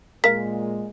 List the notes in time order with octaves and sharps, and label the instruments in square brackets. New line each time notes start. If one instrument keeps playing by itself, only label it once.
[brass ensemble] A#2 G#3 [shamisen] A#4 F5 [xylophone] B6